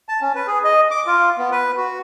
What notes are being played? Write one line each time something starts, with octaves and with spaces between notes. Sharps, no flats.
A5
C#4
B4
G#4
D#5
D6
F4
B3
B4
F#4